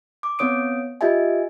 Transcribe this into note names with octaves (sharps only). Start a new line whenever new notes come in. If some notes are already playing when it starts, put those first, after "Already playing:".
D6
B3 C4 C#5 D#6 D7
F4 G4 D#5 E5 G#5